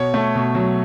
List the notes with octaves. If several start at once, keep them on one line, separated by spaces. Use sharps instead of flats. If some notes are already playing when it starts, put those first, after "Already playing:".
Already playing: B2 C#5
A3
B2
F#3